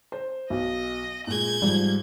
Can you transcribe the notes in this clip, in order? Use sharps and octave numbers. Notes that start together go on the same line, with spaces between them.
C5
B1 D#5
A#2 G#3 G6 G#6
G#2 F3 G3